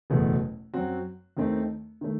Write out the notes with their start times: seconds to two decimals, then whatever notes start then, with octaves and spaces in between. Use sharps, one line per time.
0.10 F#1 E2 B2 A3
0.74 F#2 F#3 C4 F#4
1.37 D#2 D#3 A3 C4 D#4
2.01 D#3 A3